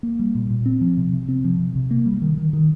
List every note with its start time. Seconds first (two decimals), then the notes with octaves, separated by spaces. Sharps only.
0.03 A#3
0.19 G3
0.35 A#2
0.50 A#2
0.66 C4
0.81 F3
0.97 C3
1.13 C3
1.29 C4
1.44 F3
1.59 C3
1.75 C3
1.91 A#3
2.06 G3
2.22 D#3
2.38 D#3
2.53 D#3